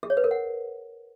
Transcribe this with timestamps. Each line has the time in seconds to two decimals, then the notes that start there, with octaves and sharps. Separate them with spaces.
0.03 G#4
0.10 C#5
0.17 B4
0.24 A#4
0.31 F#5